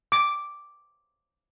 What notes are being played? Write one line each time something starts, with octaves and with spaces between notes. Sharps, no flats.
D6